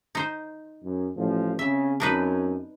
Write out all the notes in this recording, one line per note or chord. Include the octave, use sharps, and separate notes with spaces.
D#4 C5
F#2
A1 F3
C#3 C4 E5
F#2 D4 D#4 B4